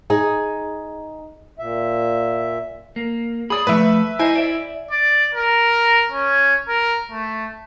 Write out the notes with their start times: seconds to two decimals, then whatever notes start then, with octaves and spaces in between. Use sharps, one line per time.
0.10 D#4 G#4
1.59 A#2 E5
2.96 A#3
3.50 G#4 D5 B5 D#6
3.67 A2 F3 A3 B4 E5
4.19 E4 C5 D#5 G#5
4.35 D5 E5
4.91 D5
5.35 A#4
6.12 C#4
6.68 A#4
7.12 A3